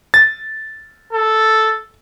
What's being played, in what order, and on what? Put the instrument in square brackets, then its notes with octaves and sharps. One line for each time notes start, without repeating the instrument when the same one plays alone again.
[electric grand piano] A6
[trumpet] A4